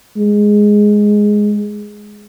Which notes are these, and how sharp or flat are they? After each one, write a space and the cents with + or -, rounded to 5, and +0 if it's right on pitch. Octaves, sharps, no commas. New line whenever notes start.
G#3 +0